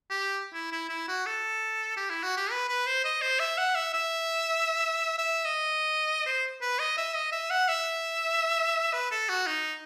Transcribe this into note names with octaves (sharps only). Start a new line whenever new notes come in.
G4
E4
E4
E4
F#4
A4
G4
E4
F#4
G4
B4
B4
C5
D#5
C5
E5
F#5
E5
E5
E5
D#5
C5
B4
D#5
E5
D#5
E5
F#5
E5
B4
A4
F#4
D#4